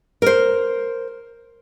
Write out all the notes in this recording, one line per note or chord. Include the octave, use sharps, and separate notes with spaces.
A#4 C5